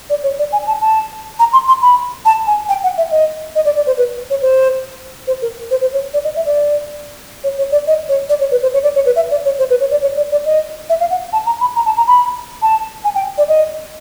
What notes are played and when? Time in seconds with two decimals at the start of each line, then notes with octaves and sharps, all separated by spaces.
0.10 D5
0.23 C#5
0.39 D5
0.52 G#5
0.67 A5
0.81 A5
1.39 A#5
1.53 C6
1.68 C6
1.82 B5
2.25 A5
2.47 G#5
2.69 G5
2.83 F#5
2.98 E5
3.11 D#5
3.55 D#5
3.65 D5
3.76 D5
3.87 C5
3.98 B4
4.30 C#5
4.42 C5
5.27 C5
5.42 A#4
5.71 C5
5.81 C5
5.93 C#5
6.14 D5
6.24 D#5
6.36 E5
6.46 D5
7.44 C#5
7.58 C#5
7.72 D5
7.87 D#5
8.09 C#5
8.29 D5
8.40 C#5
8.51 B4
8.62 C5
8.74 C#5
8.83 D5
8.95 C#5
9.06 B4
9.16 E5
9.31 D5
9.45 C#5
9.59 C5
9.70 B4
9.80 C#5
9.91 D5
10.02 C#5
10.17 D5
10.31 D5
10.46 D#5
10.90 E5
11.00 F5
11.10 F#5
11.33 A5
11.46 A#5
11.61 B5
11.76 A#5
11.86 A5
11.97 A#5
12.08 B5
12.62 A5
13.04 G#5
13.15 G5
13.38 D5
13.48 D#5